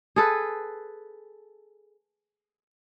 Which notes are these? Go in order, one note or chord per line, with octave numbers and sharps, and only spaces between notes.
G#4 A4 B4